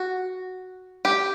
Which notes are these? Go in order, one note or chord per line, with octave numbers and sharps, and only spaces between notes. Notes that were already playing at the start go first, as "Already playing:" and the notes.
Already playing: F#4
G4